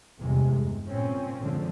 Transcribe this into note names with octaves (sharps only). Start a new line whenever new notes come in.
G1 E2 C3 G#3
E2
A#2 C4 C#4
F#2 D3 F3 G#3 C4